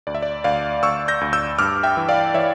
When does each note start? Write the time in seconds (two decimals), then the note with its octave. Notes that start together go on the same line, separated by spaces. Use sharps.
0.07 D2 D5
0.15 E5
0.22 D5
0.44 D2 D5 F5
0.83 D2 C#6 E6
1.08 G6 A#6
1.21 D2
1.33 E6 G6
1.59 G2 D6 F6
1.83 E5 G5
1.97 E3
2.09 D5 F5
2.34 E3 C#5 E5